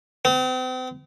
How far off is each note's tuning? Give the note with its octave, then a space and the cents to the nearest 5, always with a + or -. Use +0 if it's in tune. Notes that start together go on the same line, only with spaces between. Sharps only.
C4 -40